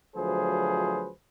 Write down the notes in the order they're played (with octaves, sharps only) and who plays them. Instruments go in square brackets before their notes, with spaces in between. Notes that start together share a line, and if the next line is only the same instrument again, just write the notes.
[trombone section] D2 F3 F#3 G#4 B4 C5